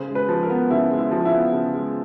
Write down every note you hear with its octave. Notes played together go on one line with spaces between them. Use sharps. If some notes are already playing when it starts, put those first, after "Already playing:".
Already playing: C#3 C5
G#3
B4
F3
A#4
B3
C#3 E4
G#3
E4
F3
F4
E4
B3
C#3
G#3